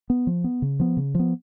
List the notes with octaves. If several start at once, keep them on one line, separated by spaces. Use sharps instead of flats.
B3
F3
B3
C#3
F3 B3
C#3
F3 B3